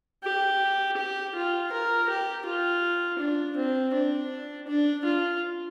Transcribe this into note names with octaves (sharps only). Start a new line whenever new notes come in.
G4
G4
F4
A#4
G4
F4
D4
C4
D4
D4
F4